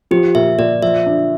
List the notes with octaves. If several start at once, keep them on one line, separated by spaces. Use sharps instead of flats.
F3 G4
A#2 E5
A#2 D5
F3 E5
D4